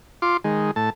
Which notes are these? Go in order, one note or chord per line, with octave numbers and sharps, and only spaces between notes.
F4 C6 D6
D#3 G#3
A2 A5